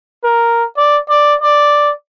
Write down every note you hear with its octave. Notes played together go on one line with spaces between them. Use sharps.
A#4
D5
D5
D5